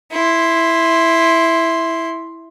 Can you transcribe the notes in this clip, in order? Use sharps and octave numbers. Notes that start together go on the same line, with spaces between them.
E4 C6